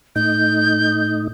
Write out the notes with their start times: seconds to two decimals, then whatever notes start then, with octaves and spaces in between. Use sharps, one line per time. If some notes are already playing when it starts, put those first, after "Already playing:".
0.16 A2 D#4 G6